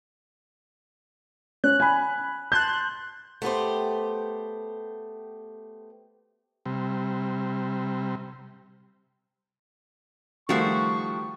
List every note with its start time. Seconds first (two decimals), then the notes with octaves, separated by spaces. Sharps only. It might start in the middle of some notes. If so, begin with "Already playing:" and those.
1.64 C#4 F#6
1.80 G#5 B5
2.52 A5 C6 F#6 G6
3.42 A3 B3 G4 C5
6.66 C3 G3
10.49 D#3 F3 G3 A3 F#4 C5 C#6